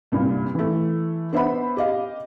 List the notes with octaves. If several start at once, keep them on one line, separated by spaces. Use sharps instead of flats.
C2 G2 A#2
E3 A3
B3 D4 C5 E5 F#5 B5
G4 D#5 F5